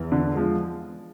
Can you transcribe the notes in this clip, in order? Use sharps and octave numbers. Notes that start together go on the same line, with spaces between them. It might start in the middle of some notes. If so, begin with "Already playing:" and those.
Already playing: E2
D3
F3 G#3